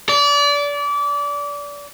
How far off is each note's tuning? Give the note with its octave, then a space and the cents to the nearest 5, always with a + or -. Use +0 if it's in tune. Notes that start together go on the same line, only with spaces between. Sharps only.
D5 -30